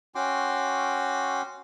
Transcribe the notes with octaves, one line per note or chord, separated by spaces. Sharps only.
C#4 F#4 G5 C6 D6